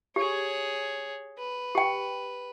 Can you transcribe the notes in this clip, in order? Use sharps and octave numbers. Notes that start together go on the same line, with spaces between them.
G4 G#4 C#5
B4
G4 G5